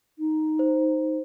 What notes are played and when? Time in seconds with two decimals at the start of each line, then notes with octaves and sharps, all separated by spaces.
0.19 D#4
0.59 C5